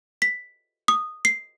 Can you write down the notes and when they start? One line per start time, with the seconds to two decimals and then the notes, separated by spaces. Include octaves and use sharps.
0.22 B6
0.88 D#6
1.25 C7